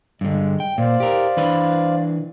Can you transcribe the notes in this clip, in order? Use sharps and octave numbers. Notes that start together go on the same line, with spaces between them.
G2 D3 G#3
G5
A#2 C5 D5 F5
G4 A#4
E3 D4 B4